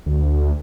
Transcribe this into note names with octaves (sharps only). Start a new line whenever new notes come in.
D2